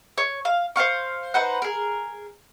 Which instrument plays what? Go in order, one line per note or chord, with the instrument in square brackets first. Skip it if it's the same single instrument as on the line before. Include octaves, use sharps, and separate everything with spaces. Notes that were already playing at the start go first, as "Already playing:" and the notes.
[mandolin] C#5
F5
C5 D5 F5 C#6
D#4 B4 C5 F#5
G#4 A#4